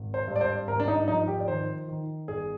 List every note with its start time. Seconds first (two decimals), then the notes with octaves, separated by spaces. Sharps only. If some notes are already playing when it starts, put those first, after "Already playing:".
Already playing: G#1
0.14 C5
0.28 G2
0.36 D5
0.41 C5
0.68 G#1 A#4
0.80 D4
0.88 D#4
1.08 F3 D#4
1.28 G4
1.40 D5
1.48 D#3 C5
1.88 D#3
2.28 G1 G#4